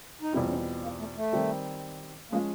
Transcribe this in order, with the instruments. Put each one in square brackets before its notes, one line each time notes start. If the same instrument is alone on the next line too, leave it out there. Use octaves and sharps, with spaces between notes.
[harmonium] D#4
[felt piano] E2 B2 G3 C4 F4 [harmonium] E4
[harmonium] C#4
A#3
A3
A3
[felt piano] D#3 G3 C4
[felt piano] F3 G#3 C#4 [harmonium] A#3